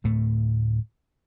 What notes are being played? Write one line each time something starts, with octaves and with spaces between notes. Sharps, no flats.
D2 A2 A3